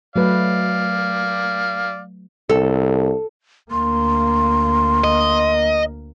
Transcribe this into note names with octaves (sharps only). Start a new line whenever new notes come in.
F#3 A3 B4 D5 F5
C2 A4
D2 A#3 C6
D#5